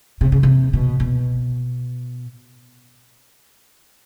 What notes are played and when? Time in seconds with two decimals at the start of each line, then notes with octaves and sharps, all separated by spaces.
0.21 C3
0.32 C#3
0.43 C3
0.73 B2
1.00 B2